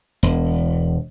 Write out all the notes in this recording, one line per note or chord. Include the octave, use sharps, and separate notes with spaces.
E1